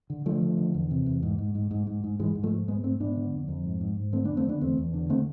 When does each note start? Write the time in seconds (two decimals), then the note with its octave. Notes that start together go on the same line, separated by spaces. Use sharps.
0.10 D3
0.26 D3 F3 A3
0.42 D3
0.58 D3
0.74 E2
0.91 C3
1.06 E2
1.23 G#2
1.38 G#2
1.55 G#2
1.71 G#2
1.87 G#2
2.04 G#2
2.19 G#2 E3 G#3
2.35 G#2
2.43 F3 A3
2.52 G#2
2.68 G#2 G#3 B3
2.84 G#2 A3 C4
3.00 G#2 B3 D4
3.16 D3
3.32 F2
3.48 F2
3.64 G#2
3.81 G#2
3.97 G#2
4.13 D3 A3 C4
4.25 B3 D4
4.29 F2
4.37 A3 C4
4.45 D3 B3 D4
4.61 E2 A3 C4
4.78 E2
4.94 D3
5.09 D3 A3 C4